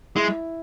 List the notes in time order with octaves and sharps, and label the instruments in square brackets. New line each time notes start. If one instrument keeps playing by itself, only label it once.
[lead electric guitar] G#3 [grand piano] E4